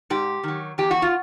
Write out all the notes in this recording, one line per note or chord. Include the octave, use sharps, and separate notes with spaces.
G#2 G4
D#3 F#3
E2 G4
F#4
F4